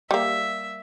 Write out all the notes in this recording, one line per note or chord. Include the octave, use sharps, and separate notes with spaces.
G3 A#3 E5